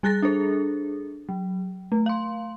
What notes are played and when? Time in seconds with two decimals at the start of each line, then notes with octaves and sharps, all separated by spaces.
0.03 G3 G#4 F#6 A6 A#6
0.22 D4 G#4 A4 C5
1.29 F#3
1.92 A3
2.06 F5 C6